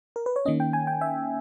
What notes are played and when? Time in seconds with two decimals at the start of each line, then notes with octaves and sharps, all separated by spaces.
0.16 A#4
0.26 B4
0.36 C#5
0.45 D#3 A#3 C#4 D#5
0.60 G5
0.73 G#5
0.87 G5
1.01 E5